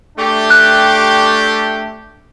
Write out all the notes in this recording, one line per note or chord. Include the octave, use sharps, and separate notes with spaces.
A3 D4 G4
F#6